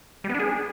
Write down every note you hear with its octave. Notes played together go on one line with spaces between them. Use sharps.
G3
B3
D4
G#4